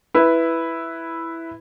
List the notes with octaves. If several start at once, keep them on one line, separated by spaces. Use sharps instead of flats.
E4 B4